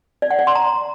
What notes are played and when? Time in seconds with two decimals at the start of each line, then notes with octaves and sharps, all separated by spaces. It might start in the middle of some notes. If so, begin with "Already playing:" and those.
0.22 D5
0.31 F#5
0.39 D5
0.47 C6
0.55 A#5